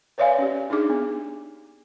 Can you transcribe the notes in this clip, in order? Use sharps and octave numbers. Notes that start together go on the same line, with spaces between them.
B4 C#5 D5 E5 F5 G#5
C#4 G4
D4 D#4 G#4 D6
B3